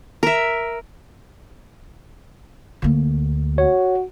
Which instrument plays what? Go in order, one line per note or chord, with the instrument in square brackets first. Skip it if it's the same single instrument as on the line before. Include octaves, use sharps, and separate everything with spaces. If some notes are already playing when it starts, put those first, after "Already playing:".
[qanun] A#4 E5
[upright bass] D2 A#3
[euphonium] F#4 [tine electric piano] C#5